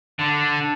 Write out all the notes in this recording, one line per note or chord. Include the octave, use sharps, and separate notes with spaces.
D3